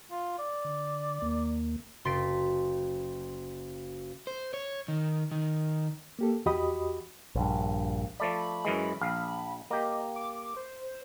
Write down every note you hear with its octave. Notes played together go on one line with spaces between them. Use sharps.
F4
D5
D3
D#2 A#3
F#1 C6 A6 B6 D7
C5
C#5
D#3
D#3
A#3 G4 A4
E2 F#4 G4 D#5 B5 D#6
A#1 G2
F3 A3 D5 B5
F#2 E3 G#3
A#1 F5
A#3 G4 D#5
D6
C5